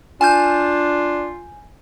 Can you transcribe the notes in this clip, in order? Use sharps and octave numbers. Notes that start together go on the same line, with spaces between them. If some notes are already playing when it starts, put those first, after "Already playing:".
D4 F4 G#5 F6 G6